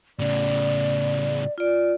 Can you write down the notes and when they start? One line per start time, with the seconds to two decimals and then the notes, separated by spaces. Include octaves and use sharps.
0.19 A2 C#3 D5
1.58 F4 D5